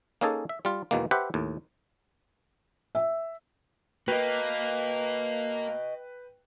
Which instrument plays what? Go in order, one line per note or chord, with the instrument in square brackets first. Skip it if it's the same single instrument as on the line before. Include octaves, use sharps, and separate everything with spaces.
[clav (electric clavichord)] A#3 C#4 D#4 G#4 A4
E5
G3 F4
E2 B2 D#3 G#3 A#3
G4 B4 C5 E5 F#5
D#2 A2
[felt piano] E5
[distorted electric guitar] A#3 [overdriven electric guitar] F#4 D#5 [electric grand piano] B4 G5